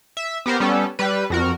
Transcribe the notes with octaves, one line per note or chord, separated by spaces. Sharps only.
E5
B3 G4 A#4 C5
G3 B3 C#4 A4
G3 B4
F2 F#4 A#4